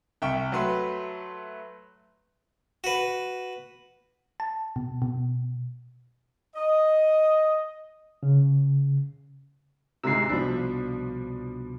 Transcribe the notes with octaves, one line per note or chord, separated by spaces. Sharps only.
C2 E5 G5 C#6
F#3 A3 B4 C6
F#4 B4
A5
B2
B2
D#5
C#3
D2 G#2 C3 E6 C7
C2 B2 F3 D4 B5